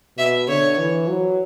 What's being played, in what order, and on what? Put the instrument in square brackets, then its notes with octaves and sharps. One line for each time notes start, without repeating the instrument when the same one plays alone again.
[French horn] B2 [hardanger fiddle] E5
[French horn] D3 [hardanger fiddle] C#5
[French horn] E3
F#3